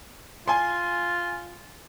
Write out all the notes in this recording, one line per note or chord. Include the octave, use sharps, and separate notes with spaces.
F4 G#5 C6